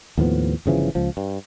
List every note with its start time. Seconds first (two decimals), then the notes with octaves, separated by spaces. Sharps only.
0.18 D#2 A2 F3 B3
0.66 G1 C#3 E3 F3
0.95 C#2 F3
1.17 G2